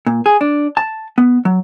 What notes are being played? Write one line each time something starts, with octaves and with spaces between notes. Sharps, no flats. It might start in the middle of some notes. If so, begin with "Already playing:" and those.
A#2
G#4
D4
A5
B3
F#3